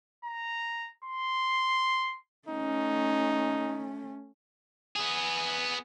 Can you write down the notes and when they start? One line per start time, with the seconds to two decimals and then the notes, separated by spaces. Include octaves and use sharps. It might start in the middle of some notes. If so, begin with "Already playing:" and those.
0.25 A#5
1.05 C6
2.49 A3 C#4 D#4
4.96 B3 G#4